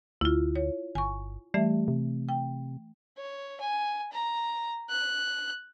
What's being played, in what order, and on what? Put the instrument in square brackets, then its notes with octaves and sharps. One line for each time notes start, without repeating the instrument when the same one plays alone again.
[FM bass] D2 [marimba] E4 F4
[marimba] C#5
[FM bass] G1 [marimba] G#5 C#6
[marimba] E3 A3 E5 [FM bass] G3
[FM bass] C3
[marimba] G5
[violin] C#5
G#5
A#5
F#6